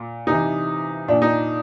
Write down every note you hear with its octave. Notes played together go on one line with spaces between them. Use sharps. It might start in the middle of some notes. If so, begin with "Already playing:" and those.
Already playing: A#2
C3 E3 D#4
A#2 D4
D#4